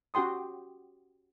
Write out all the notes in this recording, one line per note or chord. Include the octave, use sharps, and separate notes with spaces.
C#4 F#4 G4 G5 C6 D#6